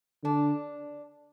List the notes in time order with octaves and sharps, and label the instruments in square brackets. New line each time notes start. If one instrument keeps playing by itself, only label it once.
[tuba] D3 [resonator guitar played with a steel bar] D4